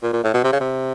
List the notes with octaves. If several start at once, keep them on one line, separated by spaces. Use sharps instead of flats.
A#2
A#2
A2
B2
C3
C#3
C3